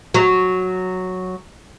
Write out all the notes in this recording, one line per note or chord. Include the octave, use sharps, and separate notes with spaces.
F#3